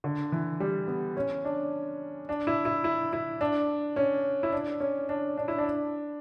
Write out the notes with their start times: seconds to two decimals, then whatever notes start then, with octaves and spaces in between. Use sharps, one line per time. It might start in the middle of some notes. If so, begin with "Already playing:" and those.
0.04 D3
0.32 E3
0.60 G3
0.88 B3
1.17 C#4
1.45 D4
2.29 D4
2.47 E4
2.65 E4
2.84 E4
3.13 E4
3.41 D4
3.96 C#4
4.43 E4
4.52 D4
4.80 C#4
5.09 D4
5.38 D4
5.48 E4
5.58 D4